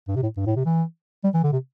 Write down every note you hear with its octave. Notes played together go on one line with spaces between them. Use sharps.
G2
C3
A2
G2
A2
C3
E3
G3
E3
D3
C3